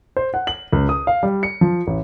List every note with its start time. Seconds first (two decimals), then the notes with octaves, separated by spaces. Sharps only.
0.16 C5
0.34 F#5
0.47 F#7
0.73 C#2
0.89 D#6
1.07 F5
1.23 G3
1.43 C#7
1.61 F3
1.87 A1